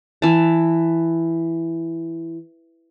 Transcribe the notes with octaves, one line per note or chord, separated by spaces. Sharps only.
E3 A5